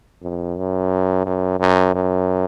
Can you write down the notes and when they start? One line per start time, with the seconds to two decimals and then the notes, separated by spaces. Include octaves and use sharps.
0.23 F2
0.58 F#2
1.26 F#2
1.60 F#2
1.95 F#2